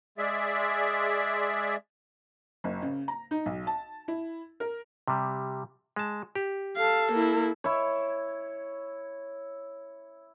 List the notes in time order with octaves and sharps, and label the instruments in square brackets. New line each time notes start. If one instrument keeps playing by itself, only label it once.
[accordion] G#3 G#4 D5 E5
[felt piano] F#1
C#3
A#5
D#4
B1
A5
E4
A#4
[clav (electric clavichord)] C3 G3
G#3 A5
G4
[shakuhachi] A4 [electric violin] F5
[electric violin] A#3 E4
[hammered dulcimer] E4 C#5